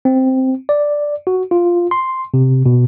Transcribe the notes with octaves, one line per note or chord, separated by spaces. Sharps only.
C4
D5
F#4
F4
C6
C3
B2